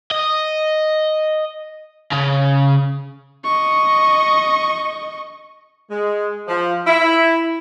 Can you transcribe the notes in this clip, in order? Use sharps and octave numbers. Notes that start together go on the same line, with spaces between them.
D#5
C#3
D#5 C#6
G#3
F3
E4